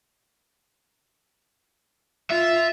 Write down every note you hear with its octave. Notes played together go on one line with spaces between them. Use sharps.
F4 E5